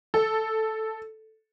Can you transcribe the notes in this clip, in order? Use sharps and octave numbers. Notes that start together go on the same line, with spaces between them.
A4